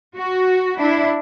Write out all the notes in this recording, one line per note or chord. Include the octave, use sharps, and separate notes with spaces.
F#4
D4 E4